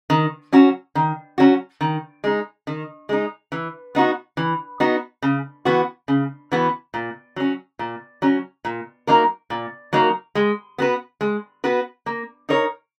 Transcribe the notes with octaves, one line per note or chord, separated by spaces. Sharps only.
D#3
F#3 C#4 F#4
D#3
F#3 C#4 F#4
D#3
G#3 D#4
D#3
G#3 D#4
E3
B3 D#4 F#4
E3
B3 D#4 F#4
C#3
E3 B3 F#4
C#3
E3 B3 F#4
A#2
F#3 C#4
A#2
F#3 C#4
A#2
F#3 A#3 D#4 A#4
A#2
F#3 A#3 D#4 A#4
G#3
B3 F#4 B4
G#3
B3 F#4 B4
A#3
D#4 A#4 C#5